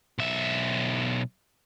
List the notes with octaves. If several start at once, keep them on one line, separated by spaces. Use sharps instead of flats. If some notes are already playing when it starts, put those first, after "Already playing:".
B1 E5